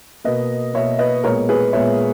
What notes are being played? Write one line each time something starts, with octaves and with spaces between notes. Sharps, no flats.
B2 A#3 B4 D#5
B2 A#3 C#5 E5
B4 D#5
A#2 G#3 B3 A#4 C#5
G#4 B4
A#2 G#3 B3 C#5 E5